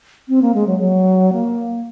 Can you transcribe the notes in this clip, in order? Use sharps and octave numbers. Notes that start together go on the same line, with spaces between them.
C4
A#3
G#3
F#3
F#3
A#3